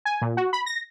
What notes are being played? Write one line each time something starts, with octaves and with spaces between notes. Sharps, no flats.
G#5
A#2
F#4
B5
A#6